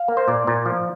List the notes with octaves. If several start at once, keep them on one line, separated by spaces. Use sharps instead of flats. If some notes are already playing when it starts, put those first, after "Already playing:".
Already playing: F5
A#3
C5
A#2 D5
A#2
F3